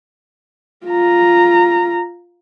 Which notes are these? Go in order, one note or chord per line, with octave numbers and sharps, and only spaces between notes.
F4 A#5